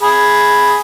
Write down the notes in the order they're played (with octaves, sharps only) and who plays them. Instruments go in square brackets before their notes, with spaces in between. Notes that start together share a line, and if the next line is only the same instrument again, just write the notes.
[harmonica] G#4 B5